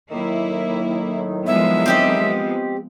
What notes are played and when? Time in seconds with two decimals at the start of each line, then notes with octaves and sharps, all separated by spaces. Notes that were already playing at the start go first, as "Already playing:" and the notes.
0.10 A2 D#3 F#3 A#3 E4
1.47 F3 G#3 B3 E5
1.86 C4 G4 D#5